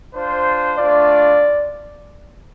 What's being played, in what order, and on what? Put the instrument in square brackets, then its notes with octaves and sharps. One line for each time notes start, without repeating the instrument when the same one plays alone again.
[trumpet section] D4 F4 C5
[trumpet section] A3 D4 F4 [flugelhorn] D5